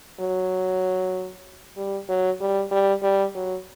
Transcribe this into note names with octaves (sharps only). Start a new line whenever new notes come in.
F#3
G3
F#3
G3
G3
G3
F#3